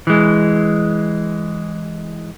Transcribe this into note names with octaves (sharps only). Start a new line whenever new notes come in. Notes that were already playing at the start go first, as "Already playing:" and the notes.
E3 G#3